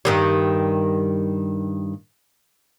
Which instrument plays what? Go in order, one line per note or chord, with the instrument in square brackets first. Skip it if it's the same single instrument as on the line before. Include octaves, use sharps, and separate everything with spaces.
[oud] G2 D#3 G3